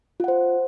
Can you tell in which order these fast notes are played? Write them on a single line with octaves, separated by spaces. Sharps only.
F4 F#5 C5